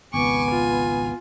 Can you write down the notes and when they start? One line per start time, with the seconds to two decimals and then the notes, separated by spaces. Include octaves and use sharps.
0.14 G#1 C#2 B3 G#5 C#6 D6
0.51 F4